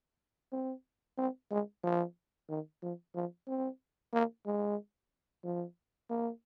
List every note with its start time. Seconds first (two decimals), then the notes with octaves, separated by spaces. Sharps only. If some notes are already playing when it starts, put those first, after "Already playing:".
0.52 C4
1.18 C4
1.51 G#3
1.83 F3
2.49 D#3
2.82 F3
3.15 F3
3.48 C4
4.13 A#3
4.46 G#3
5.44 F3
6.10 A#3